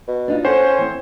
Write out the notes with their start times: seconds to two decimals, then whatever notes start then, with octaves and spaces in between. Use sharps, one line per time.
0.07 B2
0.28 D4 D#4 F4
0.45 C#4 A4 C5 F#5
0.78 E3 C4